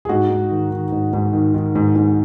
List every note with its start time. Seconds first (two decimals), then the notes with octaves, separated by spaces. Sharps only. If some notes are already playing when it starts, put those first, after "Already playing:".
0.05 G#4
0.09 G#2 D#4 F#4
0.30 G#2
0.51 D#3
0.71 D#3
0.92 G#2
1.13 G#2
1.33 D#3
1.54 D#3
1.75 G#2
1.96 G#2